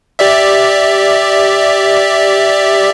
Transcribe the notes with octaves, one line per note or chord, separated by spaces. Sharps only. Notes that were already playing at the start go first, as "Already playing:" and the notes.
G4 D5 E5